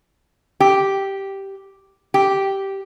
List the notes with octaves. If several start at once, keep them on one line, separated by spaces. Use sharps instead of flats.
G4
G4